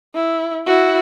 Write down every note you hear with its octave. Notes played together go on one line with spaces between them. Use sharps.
E4
E4 F#4